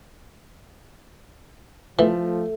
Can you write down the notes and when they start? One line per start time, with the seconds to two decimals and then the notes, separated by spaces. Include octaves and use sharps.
1.99 E3 F3 A3